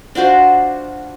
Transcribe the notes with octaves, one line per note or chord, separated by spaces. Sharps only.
D4 F4 F#4 C5